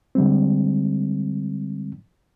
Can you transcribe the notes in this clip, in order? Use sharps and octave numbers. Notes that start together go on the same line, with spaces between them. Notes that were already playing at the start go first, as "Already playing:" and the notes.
D3 G3 G#3 C4